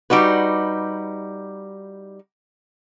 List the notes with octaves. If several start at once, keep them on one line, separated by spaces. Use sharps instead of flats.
G3 D#4 F#4 B4